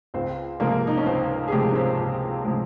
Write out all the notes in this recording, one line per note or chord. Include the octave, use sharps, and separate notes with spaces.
C#2 C4
C3 F3 G#3 A#3
D#4
C#4
C#2 C4
G#4
C3 F3 G#3 G4
C#4
C4
C#2
C3 F3 G#3